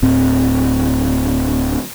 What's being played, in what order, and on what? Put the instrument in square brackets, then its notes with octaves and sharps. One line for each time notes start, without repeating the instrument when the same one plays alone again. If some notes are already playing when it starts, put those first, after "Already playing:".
[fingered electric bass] D1 A2 C4